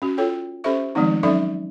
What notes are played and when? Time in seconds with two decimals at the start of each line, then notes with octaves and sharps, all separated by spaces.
0.02 C#4 F#4
0.18 F4 A4 C#5 G5
0.64 C#4 G4 A4 C5 E5 C#6
0.95 D#3 F3 G#3 A3 C4 D#4
1.23 F#3 C#4 D#4 A4 D5 E5